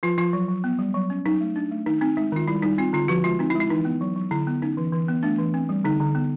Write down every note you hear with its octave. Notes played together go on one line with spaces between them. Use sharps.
F3 F4
F3 F4
F#3
F#3
B3
G3
F#3
C#4
F#3 D#4
A3
D4
A3
D#3 D#4
C4 D#4
G#3 D#4
D#3 F4
G3 E4
G3 D#4
C4 F4
D3 F4
F3 F#4
G#3 F4
C4 D#4
E4
G#3
E4
E3 D#4
B3
F#3
F#3
D3 E4
B3
C#4 D#4
E3
E3
B3
A3 D4
E3
C4
G3
D3 D#4
D3
B3